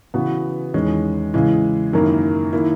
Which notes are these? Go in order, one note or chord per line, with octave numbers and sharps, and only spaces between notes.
C#3 E3 B3 F#4 B4
E2 D#3 G#3 C#4
C#3 E3 G#3
F#2 D#3 A#3 E4
D#3 A#3 E4